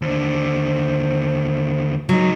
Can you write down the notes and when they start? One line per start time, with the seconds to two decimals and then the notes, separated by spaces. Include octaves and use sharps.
0.02 D#2 D3 C5
2.09 C#2 F#3 D#4